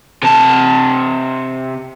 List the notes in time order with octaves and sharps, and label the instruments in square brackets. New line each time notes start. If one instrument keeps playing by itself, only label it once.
[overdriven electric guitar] C3 A5